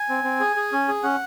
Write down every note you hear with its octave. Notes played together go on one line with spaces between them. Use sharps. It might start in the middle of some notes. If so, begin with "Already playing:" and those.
Already playing: G#5
C4
C4
G#4
G#4
C#4
G#4
C#4 F#5